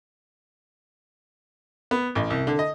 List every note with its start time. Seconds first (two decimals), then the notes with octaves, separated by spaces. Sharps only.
1.91 B3
2.15 A1
2.30 C2
2.47 D3
2.59 D#5